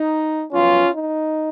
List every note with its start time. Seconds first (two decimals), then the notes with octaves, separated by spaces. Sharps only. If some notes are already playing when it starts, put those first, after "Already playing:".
Already playing: D#4
0.52 F#2 F3 B3 C#4 F4
0.94 D#4